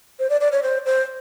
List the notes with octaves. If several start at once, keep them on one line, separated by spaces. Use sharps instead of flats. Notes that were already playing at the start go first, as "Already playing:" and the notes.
C5
D5
D5
C#5
C5
C5